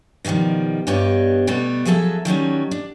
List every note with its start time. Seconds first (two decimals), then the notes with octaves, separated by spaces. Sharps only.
0.25 B2 D3 D#3 F3 G3
0.87 G2 B3 D4 G4 C#5 D#5
1.47 B2 G3 A3 B3
1.85 F3 F#3 G#4 A4 E5
2.25 D#3 F#3 G3 C#4
2.71 D4